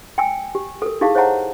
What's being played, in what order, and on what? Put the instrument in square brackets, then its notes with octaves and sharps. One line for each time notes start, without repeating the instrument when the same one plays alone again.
[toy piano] G5 G#5 E6
G4
A4 A#4
D#4 E4 G4 G#4 F5 A5
C5 C#5 D#5 F#5 A5 A#5